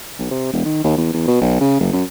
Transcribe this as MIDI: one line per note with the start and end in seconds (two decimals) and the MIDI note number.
0.19 0.26 35
0.31 0.49 48
0.53 0.62 28
0.65 0.80 51
0.84 0.93 39
0.97 1.08 40
1.13 1.25 40
1.27 1.38 47
1.41 1.61 35
1.61 1.78 49
1.80 1.89 30
1.93 2.03 42